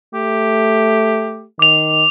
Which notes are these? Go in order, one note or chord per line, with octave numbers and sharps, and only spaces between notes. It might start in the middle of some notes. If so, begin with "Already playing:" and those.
A3 G4
D#3 D6 F7